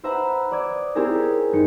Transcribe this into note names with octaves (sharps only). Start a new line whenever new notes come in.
B4 C5 E5 F#5 A#5 B5
D5 D#6 E6 G#6
C4 E4 G4 G#4 A#4 C#5
G1 D#4 C#7